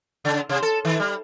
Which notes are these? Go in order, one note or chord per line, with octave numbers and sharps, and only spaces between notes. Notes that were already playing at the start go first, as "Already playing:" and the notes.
C#3
C3
A4
D#3
G3